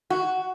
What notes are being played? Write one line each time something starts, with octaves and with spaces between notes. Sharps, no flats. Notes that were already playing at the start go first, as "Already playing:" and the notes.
F#4